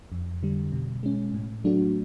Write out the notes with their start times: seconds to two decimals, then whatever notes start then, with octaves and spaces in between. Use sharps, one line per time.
0.12 F2
0.43 D3 G3
0.72 B2
1.03 G#3 C#4
1.34 A2
1.64 F#3 A3 D4 F#4